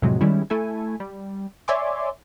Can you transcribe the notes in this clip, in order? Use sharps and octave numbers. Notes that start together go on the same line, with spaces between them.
F2 A2 C3 F#3 G#3
D#3 G3 G#3 C#4 E4
A3 E4 A4 G#5
G3
C#5 D5 E5 G#5 C6 D6